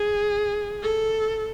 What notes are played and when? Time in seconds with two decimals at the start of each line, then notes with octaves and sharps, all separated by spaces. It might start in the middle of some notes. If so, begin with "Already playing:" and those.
Already playing: G#4
0.83 A4